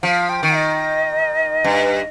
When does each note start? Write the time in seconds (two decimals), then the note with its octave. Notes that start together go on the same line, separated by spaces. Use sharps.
0.03 F3 F5
0.29 G5
0.43 D#3
0.56 D#5
1.64 G2